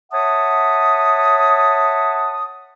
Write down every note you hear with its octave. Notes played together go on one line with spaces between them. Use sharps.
C#5 E5 F#5 A5 D#6